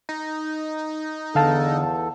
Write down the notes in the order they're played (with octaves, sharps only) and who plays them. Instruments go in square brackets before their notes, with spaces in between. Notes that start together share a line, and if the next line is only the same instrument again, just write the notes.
[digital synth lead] D#4
[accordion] E2 A4 [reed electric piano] D3 F5 A5